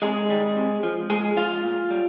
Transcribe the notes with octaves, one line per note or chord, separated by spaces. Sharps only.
C3 G#3 G#4
D#3 G3
C3
F3
A#2 G#3 G#4
F3 F4 F5
A#2
G3